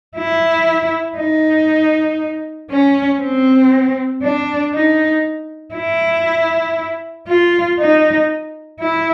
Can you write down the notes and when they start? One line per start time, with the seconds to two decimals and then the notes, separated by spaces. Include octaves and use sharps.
0.16 E4
1.18 D#4
2.70 C#4
3.21 C4
4.23 D4
4.73 D#4
5.75 E4
7.28 F4
7.79 D#4
8.80 E4